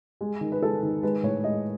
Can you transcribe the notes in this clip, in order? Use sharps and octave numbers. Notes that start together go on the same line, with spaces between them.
G#3
D#3
B4
G#3 A4
D#3
G#3 B4
A2 C#5
G#3 D#5